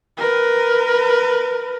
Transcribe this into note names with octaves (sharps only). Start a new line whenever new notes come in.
A#4 B4